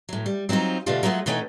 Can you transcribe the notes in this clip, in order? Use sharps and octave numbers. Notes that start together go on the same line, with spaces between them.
A2 F#3
G3
F#3 C4 C#4 D#4 F4
B2 D3 A3 D4 F4 G4
F#3 G#3 A3 F4 F#5
B2 E3 A3 C#4 D#4 G5